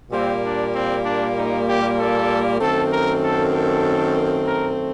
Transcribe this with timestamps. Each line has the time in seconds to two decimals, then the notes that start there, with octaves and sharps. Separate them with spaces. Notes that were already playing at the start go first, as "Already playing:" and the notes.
0.11 A#2 G3 A#3 C4
0.42 D4
0.73 C4
1.04 D4
1.35 D#4
1.66 G4
1.98 A4
2.59 F#2 D#3 A3 C4 A4
2.90 A#4
3.21 A4
3.53 A4
4.45 A#4